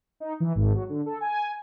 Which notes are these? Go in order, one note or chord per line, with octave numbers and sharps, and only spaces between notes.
D#4
E3
G#1
F#3
D3
A4
G#5